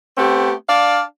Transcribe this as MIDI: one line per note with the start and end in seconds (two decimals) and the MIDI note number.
0.16 0.52 57
0.16 0.52 59
0.16 0.52 60
0.16 0.52 67
0.67 1.00 62
0.67 1.00 74
0.67 1.00 77